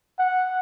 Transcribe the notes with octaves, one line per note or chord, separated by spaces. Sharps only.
F#5